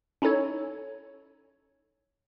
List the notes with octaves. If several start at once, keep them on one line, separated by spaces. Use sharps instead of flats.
C#4 D#4 E4 A4 C#5